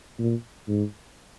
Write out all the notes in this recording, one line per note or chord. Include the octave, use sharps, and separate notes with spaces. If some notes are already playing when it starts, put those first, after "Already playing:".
A#2
G#2